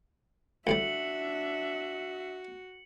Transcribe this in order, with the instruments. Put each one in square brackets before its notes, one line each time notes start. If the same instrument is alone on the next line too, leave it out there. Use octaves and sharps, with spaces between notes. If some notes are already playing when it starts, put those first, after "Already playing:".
[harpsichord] D2 A2 G3 [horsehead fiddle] D4 E5 [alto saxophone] F#4 [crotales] C#7 F#7